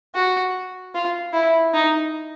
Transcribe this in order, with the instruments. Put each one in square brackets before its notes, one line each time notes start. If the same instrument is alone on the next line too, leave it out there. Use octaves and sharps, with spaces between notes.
[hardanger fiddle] F#4
F4
E4
D#4